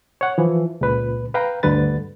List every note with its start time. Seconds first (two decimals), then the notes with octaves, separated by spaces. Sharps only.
0.21 C#5 F#5
0.38 E3 F3
0.81 C#2 A#2 B4
1.34 B4 F5 G5 A#5
1.63 D2 G2 D3 B4 A6